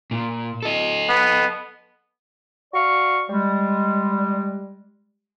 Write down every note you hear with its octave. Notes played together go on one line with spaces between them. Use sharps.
A#2
A4 D#5
B3
F#4 D5 F5 C#6
G3 G#3